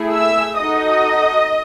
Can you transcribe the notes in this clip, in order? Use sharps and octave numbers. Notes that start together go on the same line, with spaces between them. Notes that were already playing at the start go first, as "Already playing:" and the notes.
Already playing: A3 E4 G#4
E5 E6
D#4 F#4 A4 D#5 D#6